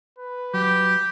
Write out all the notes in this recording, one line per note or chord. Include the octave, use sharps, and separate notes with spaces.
B4
F#3 G4